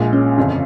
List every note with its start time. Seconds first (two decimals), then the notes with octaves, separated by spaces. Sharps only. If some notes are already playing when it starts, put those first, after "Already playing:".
Already playing: A#1 A#2 G#3
0.13 C#4
0.38 G1 F2 C#3